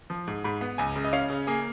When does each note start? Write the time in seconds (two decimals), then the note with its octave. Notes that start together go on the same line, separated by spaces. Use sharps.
0.10 F3
0.27 G#2
0.44 G#2 B5
0.61 B3
0.78 C#2 G#5
0.96 C#3
1.04 D#5
1.13 C#4 F5
1.30 C#3
1.47 A#3 G#4